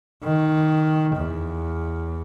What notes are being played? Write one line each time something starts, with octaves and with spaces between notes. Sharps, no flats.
D#3
E2